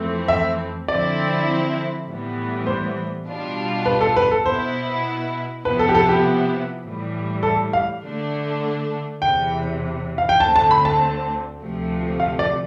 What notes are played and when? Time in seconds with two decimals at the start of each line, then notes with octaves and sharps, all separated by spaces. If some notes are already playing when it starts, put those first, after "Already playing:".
Already playing: F2 E3 A3 C4
0.28 E5
0.88 D3 F3 C4 E4 D5
2.07 A2 E3 G3 B3
2.66 C5
3.27 B2 G3 D4 F4
3.86 B4
4.01 A4
4.16 B4
4.31 A4
4.46 B2 B3 E4 C5
5.64 C3 F3 B3 E4 B4
5.79 A4
5.89 G4
5.95 A4
6.09 G4
6.83 A2 E3 G3
7.43 A4
7.73 F5
8.03 D3 A3 D4
9.22 E2 C3 E3 G5
10.18 F5
10.29 G5
10.40 D2 D3 A3 C4 A5
10.56 A5
10.71 B5
10.85 A5
11.60 D2 C3 F3 A3
12.20 F5
12.39 D5